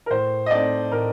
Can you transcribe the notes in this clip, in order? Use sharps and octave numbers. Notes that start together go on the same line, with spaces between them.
A#4
A2 C5
D#5
A3 C4 D#4 D5
A2 A#4